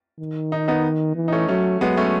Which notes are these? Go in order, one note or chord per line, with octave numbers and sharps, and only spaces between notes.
D#3
D#4
B3 D#4
E3
D#4
A3 C#4
F#3 A3 C#4
F#3 G#3 B3
A3 C#4